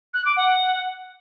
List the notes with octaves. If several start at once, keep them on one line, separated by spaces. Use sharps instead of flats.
F#6
D6
F#5